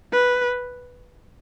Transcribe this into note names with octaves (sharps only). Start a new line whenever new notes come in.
B4